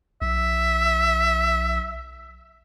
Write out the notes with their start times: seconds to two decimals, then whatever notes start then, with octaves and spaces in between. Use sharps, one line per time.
0.22 B1 E5